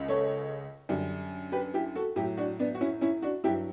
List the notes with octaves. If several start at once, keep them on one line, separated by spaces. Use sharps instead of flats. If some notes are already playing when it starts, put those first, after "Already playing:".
Already playing: C#2 C#3
A4 C#5
F#2 D3 G3
G4 B4
E4 G4
F#4 A4
A2 F#3 E4 G4
D4 F#4
B3 D4
F#4
C#4 E4
C#4 E4
D4 F#4
G2 F#3 E4 G4